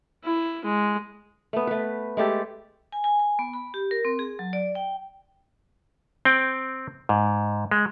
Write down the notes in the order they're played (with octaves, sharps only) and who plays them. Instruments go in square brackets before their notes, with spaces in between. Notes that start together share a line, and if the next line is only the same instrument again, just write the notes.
[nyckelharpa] E4
G#3
[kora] A3 B3
A3 B4
G#3 A3 G4 A4
[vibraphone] G#5
G#5
G#5
B3
B5
G4
A#4
C4
G#4
F#3
D5
G5
[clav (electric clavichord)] C4 G5
G#2
G#3